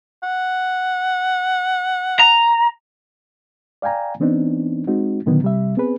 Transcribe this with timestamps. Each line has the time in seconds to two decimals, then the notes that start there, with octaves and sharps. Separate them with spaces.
0.23 F#5
2.20 A#5
3.82 D5 F5 G5 G#5 A#5
4.20 E3 B3 C4 D4 D#4
4.87 G#3 C4 D#4 F#4
5.26 A#2 D3 D#3 F#3 B3
5.42 C3 G3 E5
5.77 B3 C4 G#4 B4